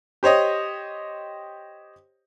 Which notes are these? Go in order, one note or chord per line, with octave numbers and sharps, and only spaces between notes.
G4 C5 C#5 D#5